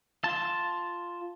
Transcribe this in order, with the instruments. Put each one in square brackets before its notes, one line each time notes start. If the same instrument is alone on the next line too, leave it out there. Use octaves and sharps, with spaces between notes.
[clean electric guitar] F4 A5